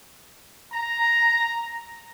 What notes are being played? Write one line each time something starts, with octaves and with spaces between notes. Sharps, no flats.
A#5